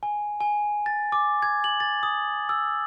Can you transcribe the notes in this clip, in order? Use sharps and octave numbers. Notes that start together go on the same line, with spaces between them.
G#5
G#5
A6
D6
G#6
F#7
A6
D#6
E6